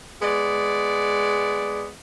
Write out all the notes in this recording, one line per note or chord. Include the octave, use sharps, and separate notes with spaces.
G#3 B3 D5